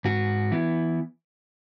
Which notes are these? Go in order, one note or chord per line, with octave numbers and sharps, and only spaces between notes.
G#2 F#4
E3 B3 E4